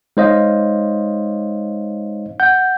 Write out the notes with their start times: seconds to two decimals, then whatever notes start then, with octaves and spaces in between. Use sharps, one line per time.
0.17 G#3 D#4 C5 C#5 D#5 F5
2.40 F#5 G6